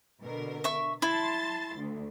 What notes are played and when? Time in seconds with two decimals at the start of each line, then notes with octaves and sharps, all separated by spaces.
0.22 B2 D3 A#4
0.64 E5 C#6
1.02 E4 A5 C6 A6
1.76 D2